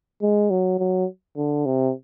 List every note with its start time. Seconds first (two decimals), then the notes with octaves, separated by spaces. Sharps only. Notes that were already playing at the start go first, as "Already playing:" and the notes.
0.22 G#3
0.50 F#3
0.79 F#3
1.37 D3
1.66 C3